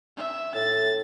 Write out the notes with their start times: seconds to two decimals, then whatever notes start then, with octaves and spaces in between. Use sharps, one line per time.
0.17 E5
0.55 A2 A6